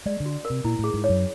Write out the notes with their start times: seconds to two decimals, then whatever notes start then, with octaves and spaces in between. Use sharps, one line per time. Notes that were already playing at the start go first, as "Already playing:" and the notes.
0.06 G#3 D5
0.20 D3
0.26 F#4
0.45 A#4
0.50 C3
0.64 A#2 E4
0.79 A2 G#4
0.94 G#2
1.04 C#5
1.09 F#2